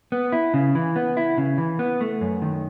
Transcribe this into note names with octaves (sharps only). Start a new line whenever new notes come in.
B3
E4
C#3
E3
B3
E4
C#3
E3
B3
A3
F#2
D#3